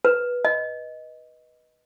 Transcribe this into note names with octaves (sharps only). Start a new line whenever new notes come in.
B4
D#5